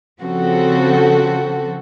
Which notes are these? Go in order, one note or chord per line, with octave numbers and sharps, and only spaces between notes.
C#3 F3 C4 F#4 A4